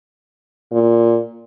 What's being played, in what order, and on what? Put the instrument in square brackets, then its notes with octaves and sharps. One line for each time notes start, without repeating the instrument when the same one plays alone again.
[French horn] A#2